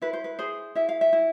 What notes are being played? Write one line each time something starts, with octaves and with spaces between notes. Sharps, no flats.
E4 B4
C5
B4
G#4 C5
E4 E5
F5
E5
E4